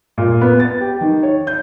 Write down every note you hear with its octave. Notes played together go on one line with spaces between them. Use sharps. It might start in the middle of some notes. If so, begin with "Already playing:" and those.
A#2
B3
A6
G4
D#3
C#5
G6